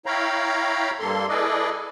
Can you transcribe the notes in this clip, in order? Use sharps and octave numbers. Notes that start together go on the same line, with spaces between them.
E4 C#5 F5 G5 A#5 B5
G2 A#3 A4 C6
E4 G#4 A4 B4 D5 D#5